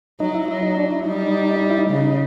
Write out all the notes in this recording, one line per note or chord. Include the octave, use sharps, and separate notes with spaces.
F#3 D#4
E4
F#3 E4
D#4
D4
E4
G3 D#4
D#4
E4
D#4
C#3